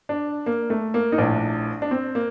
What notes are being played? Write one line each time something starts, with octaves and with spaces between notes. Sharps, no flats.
D4
A#3
A3
A#3
D#4
A#1 A2 D4
D4
C4
A#3